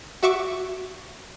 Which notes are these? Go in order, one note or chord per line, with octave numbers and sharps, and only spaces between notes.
F#4 E5 C#6 D6